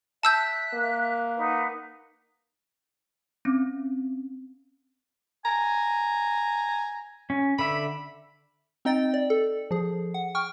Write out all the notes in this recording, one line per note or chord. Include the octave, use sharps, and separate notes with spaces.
E5 A5 E6 F#6 G6
A#3
D#4 B4 F#5
C4 C#4
G#5 A#5
C#4
D3 E5 B5
C4 D#4 D#5 G5 A6
D5
A4
F3 G#4
F#5
G5 C#6 F6